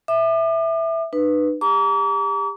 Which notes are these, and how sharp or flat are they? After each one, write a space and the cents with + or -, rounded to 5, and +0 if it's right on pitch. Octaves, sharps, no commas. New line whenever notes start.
E5 +0 D6 +40
D#4 -45 B4 +0
G4 +40 A#5 -10 D6 -45